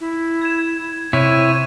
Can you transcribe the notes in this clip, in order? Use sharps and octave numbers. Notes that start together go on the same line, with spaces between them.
E4
G#6 E7
C3 E4 C#5 C#6 D#7